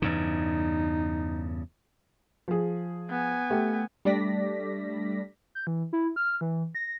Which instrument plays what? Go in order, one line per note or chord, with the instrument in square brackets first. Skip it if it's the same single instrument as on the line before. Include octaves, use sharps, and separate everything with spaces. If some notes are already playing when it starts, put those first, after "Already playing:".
[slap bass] E2 G2 C#3 [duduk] D#4
[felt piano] F3 G#4
[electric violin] B3 G#5
[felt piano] A3 G4
[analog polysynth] G3 A3 D4 D5 A#6 B6
[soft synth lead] G6
E3
E4
F6
E3
A#6